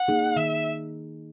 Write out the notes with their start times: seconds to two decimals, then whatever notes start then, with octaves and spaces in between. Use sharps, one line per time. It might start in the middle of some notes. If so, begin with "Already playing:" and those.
Already playing: F#5
0.08 A#3 D#4 G#4
0.36 D#3 E5